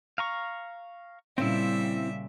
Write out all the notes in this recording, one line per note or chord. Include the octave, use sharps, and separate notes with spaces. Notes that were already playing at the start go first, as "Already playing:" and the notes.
F5 A#5 C#6
A#2 C#3 G3 C4 C#4 E4 E5